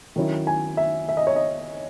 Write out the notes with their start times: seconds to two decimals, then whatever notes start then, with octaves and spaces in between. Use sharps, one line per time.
0.16 D#3 F#3 C#4 E4
0.47 G#5
0.77 E5
1.09 E5
1.17 D#5
1.27 C#5
1.36 D#5